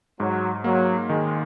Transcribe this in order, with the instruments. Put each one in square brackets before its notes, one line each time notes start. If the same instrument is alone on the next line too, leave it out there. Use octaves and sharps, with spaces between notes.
[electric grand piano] G#2 [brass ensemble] F#3
[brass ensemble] F#3 [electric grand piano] A#3
[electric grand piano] D#3 [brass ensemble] G#3